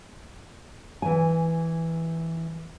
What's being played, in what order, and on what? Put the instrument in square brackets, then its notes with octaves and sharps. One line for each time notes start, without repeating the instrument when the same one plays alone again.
[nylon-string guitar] E3 G#5